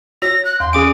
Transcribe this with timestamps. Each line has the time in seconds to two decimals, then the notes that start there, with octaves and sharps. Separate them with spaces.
0.22 F#4 C#5 A#6
0.45 F#6
0.60 E2 C6
0.73 E3 C#4 G#4 G#5 D6 D7